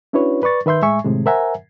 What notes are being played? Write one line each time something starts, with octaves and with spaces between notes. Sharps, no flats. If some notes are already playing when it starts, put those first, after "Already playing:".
C#4 D4 E4 F#4 B4 C#5
B4 D5 C#6 A6
D#3 B4 E5 C6 G6
A2 G#3 E5 G#5 C#6
A2 C3 D#3 G#3
A#4 C5 E5 F#5 G#5 A#5